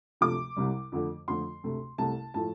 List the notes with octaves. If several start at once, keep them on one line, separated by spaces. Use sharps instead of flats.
D2 C3 F3 A3 D6
C2 C3 G3
F2 D3 A3
F2 D3 F3 A3 C6
D2 C3 A3
C2 C3 A3 A5
A2 F3 A3 A5